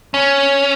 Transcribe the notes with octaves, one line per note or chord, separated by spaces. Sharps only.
C#4